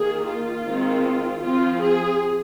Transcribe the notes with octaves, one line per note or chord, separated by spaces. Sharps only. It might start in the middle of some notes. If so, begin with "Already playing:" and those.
Already playing: D#3 A#3 G#4
F4
D#3 G#3 C4
F3 C4 F4
G#4